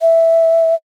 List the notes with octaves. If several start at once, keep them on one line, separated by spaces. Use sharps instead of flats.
E5